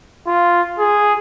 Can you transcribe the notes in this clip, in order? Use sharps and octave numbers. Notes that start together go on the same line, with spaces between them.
F4
G#4